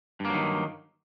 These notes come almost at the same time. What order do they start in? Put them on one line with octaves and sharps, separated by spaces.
G2 A#3 F#3 D#3